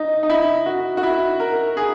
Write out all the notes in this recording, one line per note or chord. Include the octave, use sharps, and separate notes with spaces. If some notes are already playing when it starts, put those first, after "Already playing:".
Already playing: D#4
D#4
E4
F#4
F#4
E4
A#4
G#4